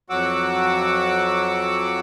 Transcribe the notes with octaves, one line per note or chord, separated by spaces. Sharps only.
F2 F#3 F#4 F#5 D6 E6